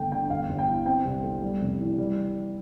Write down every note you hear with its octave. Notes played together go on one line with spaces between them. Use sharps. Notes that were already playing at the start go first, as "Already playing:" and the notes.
Already playing: G1 A3 G5
D3 G5
G1 F5
G1
G5
E3
C4 G5
C2
A3
G3
F1
E3
G3